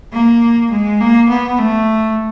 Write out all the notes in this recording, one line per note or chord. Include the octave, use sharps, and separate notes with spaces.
A#3
G#3
A#3
B3
A3